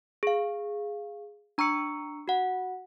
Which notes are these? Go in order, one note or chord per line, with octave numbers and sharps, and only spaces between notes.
G#4 F5
D4 A#5 C#6 E6 C#7
F#4 F#5